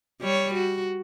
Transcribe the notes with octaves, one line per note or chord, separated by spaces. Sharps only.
G3 C#5
F#4